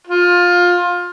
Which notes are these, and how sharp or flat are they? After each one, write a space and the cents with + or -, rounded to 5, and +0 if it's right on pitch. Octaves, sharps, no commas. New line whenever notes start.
F4 +20